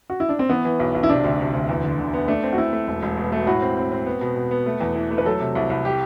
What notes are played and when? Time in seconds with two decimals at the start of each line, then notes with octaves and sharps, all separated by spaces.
0.10 F#4
0.20 E4
0.29 D4
0.39 C4
0.49 E3 B3
0.65 E3
0.80 B1
0.95 B1
1.03 E4
1.09 C3 D4
1.24 D2
1.39 C3
1.54 D2
1.69 E2
1.84 D3
1.99 D3
2.14 B3
2.28 A3 D4
2.43 C4
2.53 F#4
2.58 A3 E4
2.73 A3
2.87 E1
3.02 E1
3.17 B2
3.32 A3
3.47 A2 F#4
3.62 C4
3.77 C4
3.92 C4
4.06 B3
4.21 B2
4.36 B2
4.51 B3
4.66 A3
4.80 E2
4.96 E3
5.11 A3
5.18 B4
5.25 F#3 A4
5.40 C3
5.55 C2
5.70 C2
5.85 G4